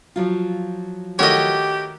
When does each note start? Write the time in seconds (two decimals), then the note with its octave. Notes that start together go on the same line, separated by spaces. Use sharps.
0.16 F3 F#3 F4
1.19 D#3 A3 F#4 G4 C#5 D#5